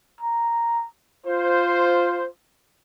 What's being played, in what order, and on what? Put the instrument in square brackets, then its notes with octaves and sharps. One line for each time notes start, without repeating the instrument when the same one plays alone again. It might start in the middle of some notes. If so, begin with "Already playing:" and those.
[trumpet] A#5
[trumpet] F4 [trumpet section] C5